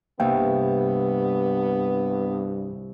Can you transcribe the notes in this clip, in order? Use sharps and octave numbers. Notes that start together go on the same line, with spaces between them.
C2 G2 A#3 B3 F5 G5